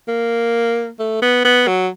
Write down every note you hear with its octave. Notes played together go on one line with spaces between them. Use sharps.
A#3
A3
B3
B3
F#3